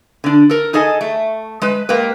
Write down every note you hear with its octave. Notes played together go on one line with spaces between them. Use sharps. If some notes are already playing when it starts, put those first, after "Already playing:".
D3 D4
A4 A#4
D#4 G#4 A4 D#5 G#5
A3
G#3 B4
G#3 A#3 G4 B4